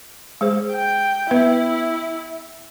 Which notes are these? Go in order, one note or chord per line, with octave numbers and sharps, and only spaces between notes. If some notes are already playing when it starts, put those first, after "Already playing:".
G#3 G#4 C5
G5
B3 E4 B4 E5